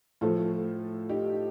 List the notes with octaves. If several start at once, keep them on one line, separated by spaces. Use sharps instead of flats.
A2 F3 A3 F4 A4
D#4 G4